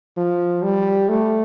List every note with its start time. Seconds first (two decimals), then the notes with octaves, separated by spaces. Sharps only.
0.17 F3
0.63 G3
1.09 A3